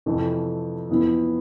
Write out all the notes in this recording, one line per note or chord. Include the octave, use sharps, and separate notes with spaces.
F2 C3 E3 A3
F2 E3 B3 E4